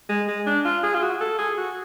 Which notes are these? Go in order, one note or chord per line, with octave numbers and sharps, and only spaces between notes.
G#3
G#3
D4
F4
G#4
F4
F#4
A4
G#4
F#4